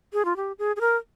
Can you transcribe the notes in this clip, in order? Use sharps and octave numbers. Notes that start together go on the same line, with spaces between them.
G#4
F4
G4
G#4
G#4
A#4